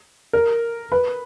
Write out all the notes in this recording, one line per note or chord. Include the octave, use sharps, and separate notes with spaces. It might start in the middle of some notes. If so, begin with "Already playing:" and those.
A#4
B4